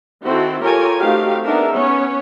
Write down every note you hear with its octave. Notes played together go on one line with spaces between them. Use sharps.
D#3 C4 E4 F#4 A4
F4 G4 A4 A#4 C#5 G#5
A3 C4 D#4 F#4 G4 F5
B3 D4 D#4 G#4 A#4 E5
B3 C#4 C#5